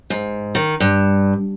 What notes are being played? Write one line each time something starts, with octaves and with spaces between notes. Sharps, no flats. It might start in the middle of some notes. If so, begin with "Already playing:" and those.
G#2
D#3
G2